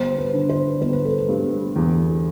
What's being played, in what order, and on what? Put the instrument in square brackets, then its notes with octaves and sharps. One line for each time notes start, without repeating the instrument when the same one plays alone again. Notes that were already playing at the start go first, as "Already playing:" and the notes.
Already playing: [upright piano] G1 [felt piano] C5
[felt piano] B4
[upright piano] D3
[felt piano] C5
[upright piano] G1 [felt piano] C5
[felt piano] B4
A4
B4
[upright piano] G2
E2